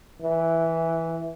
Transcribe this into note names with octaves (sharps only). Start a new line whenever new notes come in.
E3